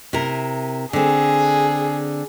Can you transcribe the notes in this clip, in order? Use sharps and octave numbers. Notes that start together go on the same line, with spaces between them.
C3 E4 A#4
D3 C4 G#4